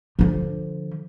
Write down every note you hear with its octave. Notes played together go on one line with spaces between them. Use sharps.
D3 F3